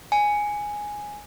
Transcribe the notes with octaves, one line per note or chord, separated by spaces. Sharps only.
G#5